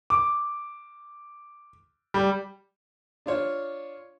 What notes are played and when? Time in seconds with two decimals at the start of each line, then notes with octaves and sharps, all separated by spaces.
0.10 D6
2.14 G3
3.26 D4 F4 C#5